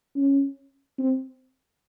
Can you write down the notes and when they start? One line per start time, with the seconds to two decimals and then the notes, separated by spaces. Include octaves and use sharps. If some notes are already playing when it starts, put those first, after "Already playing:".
0.16 C#4
0.98 C4